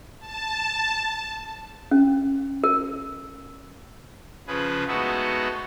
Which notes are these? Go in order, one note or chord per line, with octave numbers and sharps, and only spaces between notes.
A5
C#4
A#4
C#3 F3 G#4 B4
G#3 A3 B3 D#4 F#4 A4